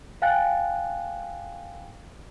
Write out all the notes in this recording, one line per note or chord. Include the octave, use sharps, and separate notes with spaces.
F5 G5 G#5 F#6 A6